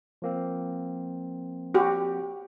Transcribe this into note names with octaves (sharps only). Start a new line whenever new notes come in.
F3 A#3 C4
F#4 G4